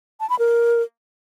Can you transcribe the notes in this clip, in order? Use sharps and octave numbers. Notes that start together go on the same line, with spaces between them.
A5
B5
A#4